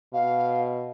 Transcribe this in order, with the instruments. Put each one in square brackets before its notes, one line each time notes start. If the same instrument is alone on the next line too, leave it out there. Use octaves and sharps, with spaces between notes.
[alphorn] B2 [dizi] F5